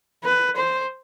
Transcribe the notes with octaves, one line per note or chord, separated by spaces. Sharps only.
B4
C5